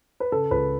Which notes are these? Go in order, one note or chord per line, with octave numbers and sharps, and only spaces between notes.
B4
C#3 A4
C#2 B4